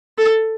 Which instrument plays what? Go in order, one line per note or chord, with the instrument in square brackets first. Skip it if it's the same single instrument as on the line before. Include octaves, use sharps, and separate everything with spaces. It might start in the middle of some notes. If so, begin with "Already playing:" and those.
[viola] A4